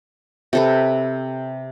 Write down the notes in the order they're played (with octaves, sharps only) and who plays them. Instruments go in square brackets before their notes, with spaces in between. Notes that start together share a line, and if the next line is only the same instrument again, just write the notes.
[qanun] C3 A4 B4